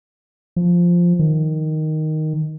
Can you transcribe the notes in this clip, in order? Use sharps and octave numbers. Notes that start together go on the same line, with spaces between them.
F3
D#3